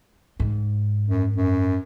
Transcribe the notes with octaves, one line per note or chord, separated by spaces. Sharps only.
G#2
F#2
F#2